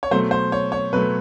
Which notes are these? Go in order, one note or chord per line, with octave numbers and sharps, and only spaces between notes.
C#5
B2 F#3 A3 C5
C5
C#5
C#5
B2 F#3 A3 B4